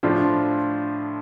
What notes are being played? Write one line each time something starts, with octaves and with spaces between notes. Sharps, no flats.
A2 F3 D4 F4